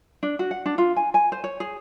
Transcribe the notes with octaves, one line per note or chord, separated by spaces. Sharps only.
D4
F#4
F#5
D4
F4
G#5
G#5
C5
C#5
G#4